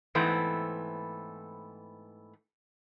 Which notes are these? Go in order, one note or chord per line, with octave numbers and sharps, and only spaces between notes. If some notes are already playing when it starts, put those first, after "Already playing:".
G#2 E3 A3 B3 C4